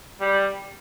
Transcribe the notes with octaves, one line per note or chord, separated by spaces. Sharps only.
G3